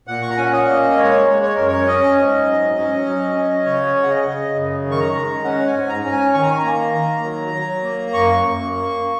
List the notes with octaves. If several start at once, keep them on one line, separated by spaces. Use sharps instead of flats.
A#2 F#5
C#6
A#5
C#4 G#5
F#5
D#5
A#3
G#3 C#5
G#3
C#5
F#2 A#4
C#5
C#4 D#5
G#2
F#3
C#4
F#3
C#4
C#3 C#5
C#3
F#5
D#5
C#3
F#2
D#3
C#6
A#5
G#3
C#4 F#5
G#5
G#2
A#5
C#4
G#5
D#3 C#6
A#5
G#5
A#5
A#3
D#3
F#3
F#3
A#3
F#2 C#6
F#2
A#3